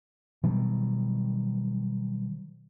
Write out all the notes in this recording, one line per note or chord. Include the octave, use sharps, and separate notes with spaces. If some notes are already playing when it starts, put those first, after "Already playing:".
B2 D#3 F#3 G3